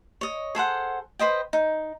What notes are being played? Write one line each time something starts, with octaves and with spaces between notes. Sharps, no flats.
C#5 D#5
G#4 A4 C5 F#5
B4 C5 D#5 G5
D#4